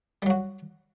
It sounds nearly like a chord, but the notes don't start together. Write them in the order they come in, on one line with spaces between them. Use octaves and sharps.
G3 F#3 F#4